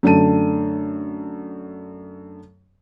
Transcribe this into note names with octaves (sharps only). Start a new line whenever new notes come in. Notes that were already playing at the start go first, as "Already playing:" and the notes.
F#2 D3 A3 A5 D#7